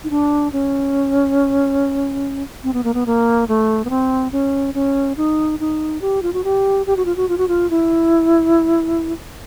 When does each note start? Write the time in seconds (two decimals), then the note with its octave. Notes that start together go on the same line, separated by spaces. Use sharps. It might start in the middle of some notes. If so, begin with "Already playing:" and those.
0.04 D#4
0.10 D4
0.53 C#4
2.64 C4
2.73 B3
2.84 A#3
2.94 B3
3.06 A#3
3.48 A3
3.85 B3
3.90 C4
4.32 C#4
4.75 C#4
5.17 D#4
5.60 D#4
6.01 G4
6.22 F4
6.33 F#4
6.44 G4
6.87 G4
6.97 F#4
7.05 F4
7.16 F#4
7.29 F4
7.38 F#4
7.48 F4
7.70 E4